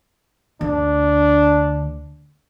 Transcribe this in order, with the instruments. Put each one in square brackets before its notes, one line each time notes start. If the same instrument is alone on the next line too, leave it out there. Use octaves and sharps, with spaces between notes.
[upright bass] D2 [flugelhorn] D4